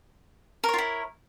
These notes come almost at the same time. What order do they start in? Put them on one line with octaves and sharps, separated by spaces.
A#4 C#5 F4 E4